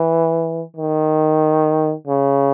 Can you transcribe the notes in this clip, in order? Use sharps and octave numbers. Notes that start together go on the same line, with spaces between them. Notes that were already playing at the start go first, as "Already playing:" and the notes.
Already playing: E3
D#3
C#3